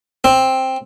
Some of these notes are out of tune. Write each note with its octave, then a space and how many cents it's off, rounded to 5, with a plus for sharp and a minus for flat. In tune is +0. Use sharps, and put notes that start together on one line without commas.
C4 +5